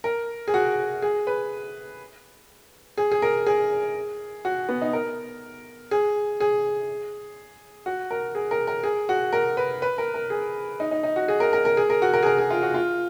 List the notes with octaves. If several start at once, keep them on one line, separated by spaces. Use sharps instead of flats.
A#4
G#4
F#4
G#4
B4
G#4
G#4
A#4
G#4
F#4
B3
D#4
A#4
G#4
G#4
F#4
A#4
G#4
A#4
A#4
G#4
F#4
A#4
B4
B4
A#4
A#4
G#4
D#4
D#4
D#4
F#4
G#4
A#4
A#4
A#4
G#4
A#4
F#4
A#4
G#4
A#4
G#4
F4
F#4
F4